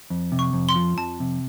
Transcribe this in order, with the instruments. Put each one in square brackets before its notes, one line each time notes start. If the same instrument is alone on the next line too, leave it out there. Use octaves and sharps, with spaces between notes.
[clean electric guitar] F2
C3
[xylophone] C#6
[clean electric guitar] F2
[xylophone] C6
[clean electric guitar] F3
[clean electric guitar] F2 [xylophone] A5
[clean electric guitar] C3